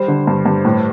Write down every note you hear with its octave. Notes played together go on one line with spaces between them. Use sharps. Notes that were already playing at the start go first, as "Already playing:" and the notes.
Already playing: G3 C5
D3
G2
G2
A2